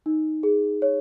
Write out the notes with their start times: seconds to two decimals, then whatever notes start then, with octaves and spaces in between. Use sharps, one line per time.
0.06 D#4
0.43 G#4
0.82 C#5